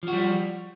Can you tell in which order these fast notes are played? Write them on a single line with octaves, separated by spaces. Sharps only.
F3 F#4 G3